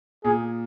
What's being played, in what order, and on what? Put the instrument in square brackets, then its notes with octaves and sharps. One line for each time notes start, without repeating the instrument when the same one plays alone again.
[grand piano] A#2 [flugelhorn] G#4